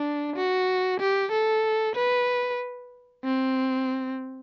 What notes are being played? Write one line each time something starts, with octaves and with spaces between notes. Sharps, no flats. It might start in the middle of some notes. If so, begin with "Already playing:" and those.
Already playing: D4
F#4
G4
A4
B4
C4